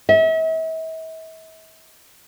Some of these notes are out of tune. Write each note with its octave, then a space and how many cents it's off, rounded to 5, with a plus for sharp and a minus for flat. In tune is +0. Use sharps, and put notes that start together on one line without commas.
E5 -40